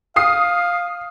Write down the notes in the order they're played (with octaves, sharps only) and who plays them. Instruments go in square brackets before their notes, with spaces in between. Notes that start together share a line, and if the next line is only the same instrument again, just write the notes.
[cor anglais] F5 [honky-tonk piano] D#6 C7